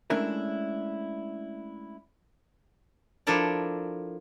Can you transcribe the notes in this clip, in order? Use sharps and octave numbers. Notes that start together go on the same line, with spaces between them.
G#3 A3 C#4 D4 E4 A#4
F3 D4 E4 A4 A#4 D5